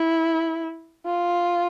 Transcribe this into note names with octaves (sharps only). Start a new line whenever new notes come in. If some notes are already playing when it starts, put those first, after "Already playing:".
Already playing: E4
F4